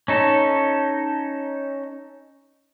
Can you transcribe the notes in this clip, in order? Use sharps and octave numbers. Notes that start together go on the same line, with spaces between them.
C#4 D#4 A4